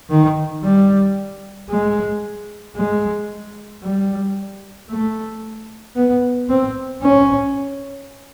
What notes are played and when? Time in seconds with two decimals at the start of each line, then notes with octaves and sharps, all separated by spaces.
0.10 D#3
0.63 G3
1.69 G#3
2.76 G#3
3.83 G3
4.90 A3
5.96 B3
6.49 C4
7.02 C#4